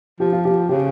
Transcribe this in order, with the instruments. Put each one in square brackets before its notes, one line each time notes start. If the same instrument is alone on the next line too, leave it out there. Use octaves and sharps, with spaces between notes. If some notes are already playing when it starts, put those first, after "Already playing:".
[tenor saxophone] F3 [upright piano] G4
[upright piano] F4
G4
[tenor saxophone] C#3 [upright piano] G4